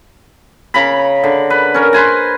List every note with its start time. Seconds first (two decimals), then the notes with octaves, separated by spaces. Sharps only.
0.74 C#3 A#5 B5
1.24 D3
1.50 B4
1.74 C#4 A#4
1.93 B4 C5 G#5 A#5